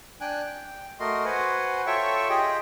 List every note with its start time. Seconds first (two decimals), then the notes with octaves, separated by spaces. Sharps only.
0.21 D4 G5 G#5 F#6
0.46 G5
1.00 A3 F#4 A#4 D#5 C6
1.25 F#4 B4 C5 F#5 G#5
1.87 F4 A4 C#5 E5 G5 C#6
2.29 F4 G4 G#4 D#5 G5